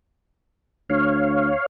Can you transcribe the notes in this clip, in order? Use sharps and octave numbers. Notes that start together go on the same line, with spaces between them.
D2 C#5 F5